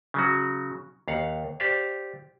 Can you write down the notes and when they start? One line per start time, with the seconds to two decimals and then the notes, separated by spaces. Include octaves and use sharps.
0.14 C#3 F#3 F#4
1.08 D#2 F5 F#5
1.60 G4 C5 D5 F5